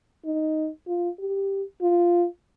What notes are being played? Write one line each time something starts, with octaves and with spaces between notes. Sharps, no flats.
D#4
F4
G4
F4